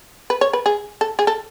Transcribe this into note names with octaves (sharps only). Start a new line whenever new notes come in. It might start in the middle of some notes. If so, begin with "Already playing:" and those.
B4
C#5
B4
G#4
A4
G#4
A4